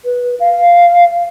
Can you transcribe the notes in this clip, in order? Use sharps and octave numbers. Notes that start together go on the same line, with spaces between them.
B4
F5